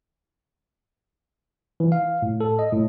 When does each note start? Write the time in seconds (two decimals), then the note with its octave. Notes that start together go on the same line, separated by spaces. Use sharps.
1.80 E3
1.92 F5
2.22 A2
2.41 A4
2.59 D#5
2.72 A2